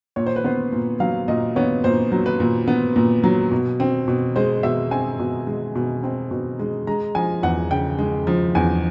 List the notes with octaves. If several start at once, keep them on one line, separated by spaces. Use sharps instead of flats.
A#2 C#5
C5
B4
B3 C5
A#2
F#3 F5
A#2 D#5
B3 C#5
A#2 C5
F#3
B4
A#2
B3
A#2
F#3
B2
C4
B2
G#3 C5
B2 E5
C4 G#5
B2
G#3
B2
C4
B2
G#3
G#3 A#5
F3 G#5
E2 F#5
C#3 G5
G#3
F3
E2 G#5